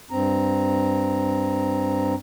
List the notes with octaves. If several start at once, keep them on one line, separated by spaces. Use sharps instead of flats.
G2 C4 A#5